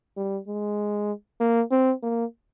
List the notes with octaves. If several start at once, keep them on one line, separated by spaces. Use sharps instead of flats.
G3
G#3
A#3
C4
A#3